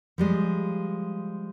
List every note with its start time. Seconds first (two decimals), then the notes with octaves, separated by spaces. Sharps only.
0.18 F3 G3 G#3